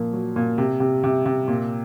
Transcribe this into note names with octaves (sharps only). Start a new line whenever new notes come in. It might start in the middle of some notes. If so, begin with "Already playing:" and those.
Already playing: A#2 F3 A#3
F#3
A#2
C3
C3
C3
C3
A#2